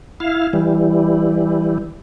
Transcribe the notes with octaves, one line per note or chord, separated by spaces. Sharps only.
E4 F5
E3 G3